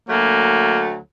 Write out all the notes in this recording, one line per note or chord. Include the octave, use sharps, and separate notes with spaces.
D2 F#3 A3 A#3